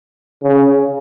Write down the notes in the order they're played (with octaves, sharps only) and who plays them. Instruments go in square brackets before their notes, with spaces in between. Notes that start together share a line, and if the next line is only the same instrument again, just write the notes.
[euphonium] C#3